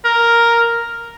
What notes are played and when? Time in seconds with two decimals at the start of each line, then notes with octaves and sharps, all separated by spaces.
0.05 A#4